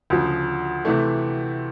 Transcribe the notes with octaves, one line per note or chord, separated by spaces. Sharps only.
D2 C#3 F3
C3 E3 A3